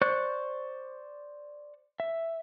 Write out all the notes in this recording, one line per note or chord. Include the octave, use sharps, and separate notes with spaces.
C5 D5 C#6 F#6
E5